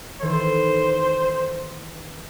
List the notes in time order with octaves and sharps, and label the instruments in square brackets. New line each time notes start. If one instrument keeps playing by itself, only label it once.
[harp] D#3 E3 A4 [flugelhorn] C5